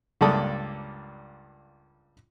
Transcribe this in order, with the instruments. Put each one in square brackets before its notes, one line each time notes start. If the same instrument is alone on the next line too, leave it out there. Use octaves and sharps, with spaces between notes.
[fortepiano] C#2 G2 A#3 A4 D5 D#6